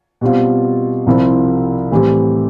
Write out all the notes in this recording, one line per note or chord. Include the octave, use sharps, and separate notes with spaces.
B2 G3 C4 F4
C2 C3 F3 C4 E4
A2 E3 G3 C4 G4